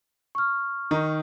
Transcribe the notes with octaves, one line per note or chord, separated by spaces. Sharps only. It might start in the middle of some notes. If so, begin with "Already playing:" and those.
C#6 F6
D#3 D#4